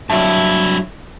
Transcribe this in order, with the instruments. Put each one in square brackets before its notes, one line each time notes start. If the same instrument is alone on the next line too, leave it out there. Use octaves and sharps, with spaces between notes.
[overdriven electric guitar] G2 E4 [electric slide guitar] F#3 E5 A5